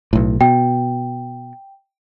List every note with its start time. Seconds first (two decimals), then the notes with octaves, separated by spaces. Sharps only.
0.13 B1 A2
0.41 B2 G5